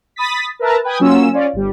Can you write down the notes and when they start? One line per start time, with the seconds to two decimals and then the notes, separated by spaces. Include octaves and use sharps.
0.16 B5 D#6 A6 B6
0.59 A#4 B4 E5 A5 A#5
0.84 B4 G5 G#5 D#6
1.00 F#3 A#3 C#4 F4 E6
1.33 C#4 F4 D5
1.53 G1 G3